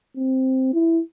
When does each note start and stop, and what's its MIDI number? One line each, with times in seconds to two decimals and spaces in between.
0.17 0.72 60
0.73 1.01 64